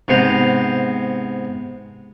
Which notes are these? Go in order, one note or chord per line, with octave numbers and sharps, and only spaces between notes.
G#2 C3 B3 C5 A#5